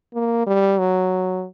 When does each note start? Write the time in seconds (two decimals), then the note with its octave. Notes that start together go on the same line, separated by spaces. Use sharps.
0.14 A#3
0.47 G3
0.79 F#3